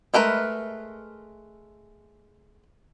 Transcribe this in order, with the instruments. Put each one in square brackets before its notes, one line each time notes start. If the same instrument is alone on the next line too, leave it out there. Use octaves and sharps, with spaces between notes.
[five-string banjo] G#3 A3 A#4 B4